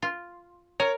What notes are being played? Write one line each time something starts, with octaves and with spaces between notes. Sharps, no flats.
F4
A#4 C#5